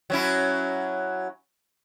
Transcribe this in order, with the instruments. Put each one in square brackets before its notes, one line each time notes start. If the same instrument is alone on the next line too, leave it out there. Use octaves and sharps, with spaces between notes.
[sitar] F#3 C#4 E4